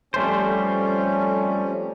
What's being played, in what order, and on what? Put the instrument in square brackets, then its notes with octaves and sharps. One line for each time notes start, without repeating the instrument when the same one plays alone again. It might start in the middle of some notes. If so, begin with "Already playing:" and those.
[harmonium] F2 C#4 [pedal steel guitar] G3 A3 C5